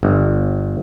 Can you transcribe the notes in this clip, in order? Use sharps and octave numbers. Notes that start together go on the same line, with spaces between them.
G1